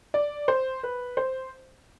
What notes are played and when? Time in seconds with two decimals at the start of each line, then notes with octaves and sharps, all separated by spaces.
0.14 D5
0.48 C5
0.83 B4
1.17 C5